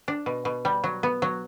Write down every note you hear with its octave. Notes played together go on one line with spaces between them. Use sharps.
D4
B2
B2
G3
F#3
B3
F#3